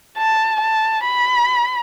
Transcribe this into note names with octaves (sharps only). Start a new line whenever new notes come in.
A5
A5
B5